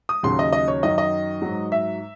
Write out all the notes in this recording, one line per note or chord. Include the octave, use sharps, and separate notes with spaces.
D#6
D#2 C#3 F#3 C6
D#5
D#5
C#5
F#2 D#3 F#3 D#5
D#5
G#2 F#3
E5